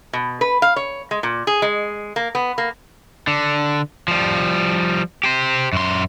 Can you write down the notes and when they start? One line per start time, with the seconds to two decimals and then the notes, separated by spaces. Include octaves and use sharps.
0.13 B2
0.41 B4
0.62 F5
0.76 C#5
1.11 G#3
1.23 A#2
1.47 G#4
1.62 G#3
2.16 A#3
2.35 B3
2.58 A#3
3.27 D3
4.08 F3 G3
5.24 G4 C5
5.73 F#2 C6